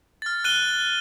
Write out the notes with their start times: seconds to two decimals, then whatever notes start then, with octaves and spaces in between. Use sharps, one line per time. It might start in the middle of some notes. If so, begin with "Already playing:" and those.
0.22 F6 A6
0.44 F#6 D#7 G7